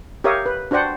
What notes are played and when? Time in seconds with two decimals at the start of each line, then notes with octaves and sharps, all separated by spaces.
0.24 G4 A#4 C#5 E5 F5 D#6
0.46 B4
0.71 D4 F#4 C5 D5 F#5 G5